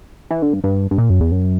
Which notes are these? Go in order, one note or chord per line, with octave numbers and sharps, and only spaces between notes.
E3
D3
G2
G2
G2
A#2
F#2
E2
F#2